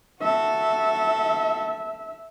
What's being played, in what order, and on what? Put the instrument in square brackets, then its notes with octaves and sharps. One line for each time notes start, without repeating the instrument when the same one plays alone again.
[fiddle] F#4 A4 [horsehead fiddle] E5